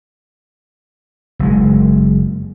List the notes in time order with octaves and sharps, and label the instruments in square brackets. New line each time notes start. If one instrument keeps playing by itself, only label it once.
[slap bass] F#1 G#3